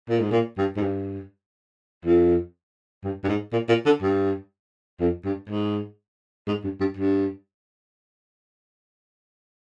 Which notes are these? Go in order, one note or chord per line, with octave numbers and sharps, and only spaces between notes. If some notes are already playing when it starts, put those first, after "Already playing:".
A#2
G#2
A#2
G2
G#2
G2
F2
G2
G2
G#2
A#2
A#2
D3
G2
F2
G2
G#2
G#2
G2
G2
G2